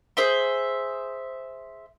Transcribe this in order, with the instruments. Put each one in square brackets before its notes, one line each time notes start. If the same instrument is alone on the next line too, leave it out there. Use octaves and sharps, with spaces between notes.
[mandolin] G#4 C5 E5 C6